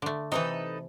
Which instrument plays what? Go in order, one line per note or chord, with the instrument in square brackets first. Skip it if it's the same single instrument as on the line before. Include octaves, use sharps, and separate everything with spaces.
[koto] D3 A3
[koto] C3 E3 [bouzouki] D#4 A4 B4